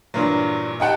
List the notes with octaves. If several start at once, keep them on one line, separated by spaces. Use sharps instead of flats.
G2 A#2 E3 F#3
D#4 G4 F#5 G5 A5